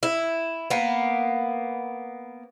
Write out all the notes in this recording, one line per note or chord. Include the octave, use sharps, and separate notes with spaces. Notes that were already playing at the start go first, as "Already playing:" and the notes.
E4
A#3 B3